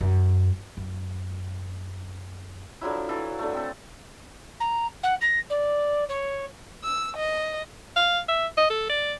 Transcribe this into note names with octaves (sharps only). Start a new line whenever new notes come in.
F#2
F#2
D3 F3 F#3 E4
E3 F#3 A4
D3 A3
C4 A4
A#5
F#5
A#6
D5
C#5
E6
D#5
F5
E5
D#5
A4
D5